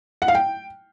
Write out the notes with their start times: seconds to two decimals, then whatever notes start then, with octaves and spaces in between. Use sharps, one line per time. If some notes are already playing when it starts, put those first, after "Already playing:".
0.22 F#5
0.28 F5
0.35 G5